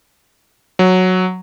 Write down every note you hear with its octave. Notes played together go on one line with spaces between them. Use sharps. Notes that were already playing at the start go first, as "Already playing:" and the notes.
F#3